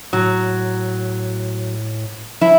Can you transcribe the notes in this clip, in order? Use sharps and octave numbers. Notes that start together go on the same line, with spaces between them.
A2 F#3
F3 E4